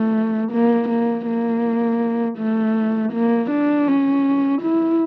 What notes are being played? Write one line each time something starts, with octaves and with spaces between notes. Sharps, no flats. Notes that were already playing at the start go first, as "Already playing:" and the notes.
Already playing: A3
A#3
A#3
A#3
A3
A#3
D4
C#4
E4